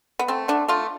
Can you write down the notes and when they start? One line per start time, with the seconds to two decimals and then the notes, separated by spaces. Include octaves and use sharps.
0.19 B3
0.28 A3 C4
0.48 D3 D4
0.68 A3 F4